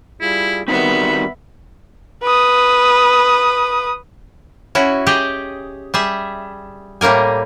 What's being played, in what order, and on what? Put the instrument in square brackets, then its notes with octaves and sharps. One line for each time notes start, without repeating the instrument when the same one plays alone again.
[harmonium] G3 F4 G#4 [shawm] E4
[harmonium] D#3 G3 [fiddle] B3 E5 [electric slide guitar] C4 D#4 F#4 [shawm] B5
[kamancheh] B4 D#6
[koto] C#4 E4 F#4
G4 G#4 D#5
G3 G#4 E5
A2 G3 A#3 A#4 G#5